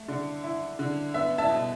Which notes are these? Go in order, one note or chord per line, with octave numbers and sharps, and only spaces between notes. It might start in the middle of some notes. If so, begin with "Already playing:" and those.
Already playing: A3
D3
E4
D3
B3 E5
E5 A5
B2